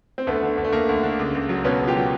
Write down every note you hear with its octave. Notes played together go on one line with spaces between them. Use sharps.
C4
D2 A3 B3
D3
D2
A3
D2 A#3
D2
D3
C#2
C#2
F#3
B2 B3 C#4
C#2
F4 G4
F#3